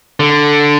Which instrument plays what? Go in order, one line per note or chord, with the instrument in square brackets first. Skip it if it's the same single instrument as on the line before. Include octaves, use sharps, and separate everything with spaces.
[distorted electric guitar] D3